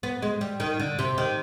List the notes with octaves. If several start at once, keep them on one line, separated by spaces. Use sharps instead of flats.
B3
G#3
G3
D#3
D3
C3
D#3